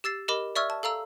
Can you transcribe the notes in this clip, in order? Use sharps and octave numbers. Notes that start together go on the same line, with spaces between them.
G4 E6 A6 C7
G4 A#4 D#5 B5 D6
D5 E5 C#6 E6 F6 G#6
A5
A4 F5 A#5 E6